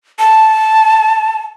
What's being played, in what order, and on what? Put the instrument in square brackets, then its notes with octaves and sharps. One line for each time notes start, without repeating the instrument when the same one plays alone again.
[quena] A5